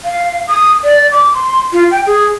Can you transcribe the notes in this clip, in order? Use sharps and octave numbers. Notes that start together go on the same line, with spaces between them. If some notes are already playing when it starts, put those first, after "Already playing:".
F5
D#6
D5
D6
C6
F4
G5
G#4